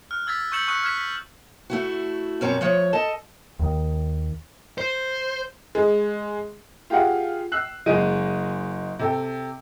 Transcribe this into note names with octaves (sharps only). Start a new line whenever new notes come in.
F6 F#6
E6 G#6 A6 B6
C#6 E6 G6 C#7 E7 F#7
C#6 D#6 F#6 C#7
F6 F#6 G#6 B6 E7
B6
A3 E4 F#4
F#2 B2 G3 C4 C#5 A#5
F3 A3 C#5
A4 D#5 A5
D#2 D#3
C5
G#3
F4 G4 G#4 F5 F#5
E6 F#6 C7 F#7
F#1 G#3 G#4 D#5 D7 D#7
C3 A4 G5